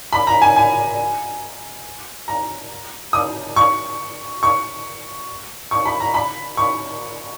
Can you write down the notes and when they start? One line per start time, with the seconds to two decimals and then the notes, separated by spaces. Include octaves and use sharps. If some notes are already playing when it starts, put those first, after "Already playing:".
0.13 B5
0.27 A#5
0.42 G#5
0.56 G#5
2.28 A#5
3.13 D#6
3.56 C#6
4.43 C#6
5.71 C#6
5.85 B5
6.00 A#5
6.14 B5
6.57 C#6